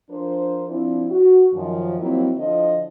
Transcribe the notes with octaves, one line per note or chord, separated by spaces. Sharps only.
F3 D4 A#4 C5
F3 C4 D4 E4
F#4
F#2 D#3 F3
F3 F#3 A#3 C4 D#4 E4
D3 F3 E4 D#5